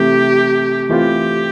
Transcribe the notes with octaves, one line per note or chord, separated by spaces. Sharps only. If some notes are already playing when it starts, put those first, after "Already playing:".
Already playing: C3 E3 A3 G4
E3 A3 C4 F4 G4